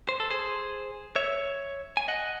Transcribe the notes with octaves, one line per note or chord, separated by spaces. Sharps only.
C5
A4
G#4 C5
C#5 E5
G#5
D#5 F#5